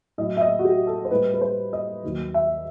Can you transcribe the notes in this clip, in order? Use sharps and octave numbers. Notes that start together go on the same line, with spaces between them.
A2 F#3 D#5
E5
D#5
F#4
G4
A4
C5
A2 G3 B4
B4
C5
D#5
D#2 D#3 F#3
E5